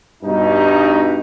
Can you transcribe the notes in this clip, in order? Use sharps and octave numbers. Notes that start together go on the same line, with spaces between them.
G2 B2 D#4